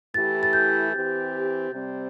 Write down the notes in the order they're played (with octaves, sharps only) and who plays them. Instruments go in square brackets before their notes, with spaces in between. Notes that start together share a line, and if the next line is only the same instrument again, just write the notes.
[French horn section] E3 A3 E4 G4 [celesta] A6
[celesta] A6
G6
[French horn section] E3 C4 G4
C3 G3 C4